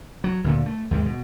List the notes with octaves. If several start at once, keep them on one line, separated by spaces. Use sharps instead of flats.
F#3
D2 A#2 D3
A3
D#2 G#2 C3 G#3
B2